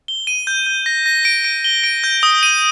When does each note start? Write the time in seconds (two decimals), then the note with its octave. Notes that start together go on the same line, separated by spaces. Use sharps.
0.08 G7
0.27 D#7
0.47 G6
0.66 G6
0.86 A#6
1.06 A#6
1.25 D7
1.45 D7
1.64 G7
1.84 D7
2.04 G6
2.23 D#6
2.43 D#7